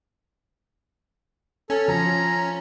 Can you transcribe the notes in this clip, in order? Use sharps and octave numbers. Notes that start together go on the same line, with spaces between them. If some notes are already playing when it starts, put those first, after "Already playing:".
C#4 A4
F3 A#5